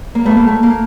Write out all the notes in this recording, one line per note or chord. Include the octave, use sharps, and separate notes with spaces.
A#3
A3 B3
A#3
A3
A#3